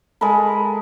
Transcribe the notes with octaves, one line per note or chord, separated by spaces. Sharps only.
G#3 A4 A#4 B5